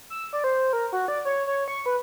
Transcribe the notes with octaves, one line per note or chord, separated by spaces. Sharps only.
E6
D5
C5
A#4
F#4
D5
C#5
C#5
C#6
B4